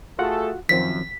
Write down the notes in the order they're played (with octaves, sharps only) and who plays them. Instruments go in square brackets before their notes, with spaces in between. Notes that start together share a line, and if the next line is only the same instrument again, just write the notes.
[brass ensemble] A3 G#4 A4 [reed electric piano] F4 F#4 F#5
[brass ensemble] F#2 [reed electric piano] D#3 F3 C4 [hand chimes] B6